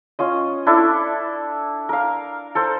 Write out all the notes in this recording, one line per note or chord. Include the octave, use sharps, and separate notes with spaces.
C#4 F4 D#5
D4 E4 A4
A#4 F5
A4 A#4 C5